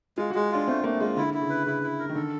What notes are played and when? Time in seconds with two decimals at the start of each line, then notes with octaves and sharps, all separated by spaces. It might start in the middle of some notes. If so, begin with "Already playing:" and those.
0.18 G#3 F4
0.30 G#3 F#4
0.51 D4 F4
0.68 A3 C4
0.84 A3 A#3
1.00 G#3 F4
1.17 D3 E4
1.34 E4
1.41 C#3
1.50 B4
1.66 C#3 E4
1.83 E4
1.99 A#4
2.09 D#3
2.15 D3 A4